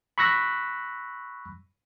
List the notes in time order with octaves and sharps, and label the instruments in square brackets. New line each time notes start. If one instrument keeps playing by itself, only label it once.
[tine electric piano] B5 C#6 E6 F#6 A#6 B6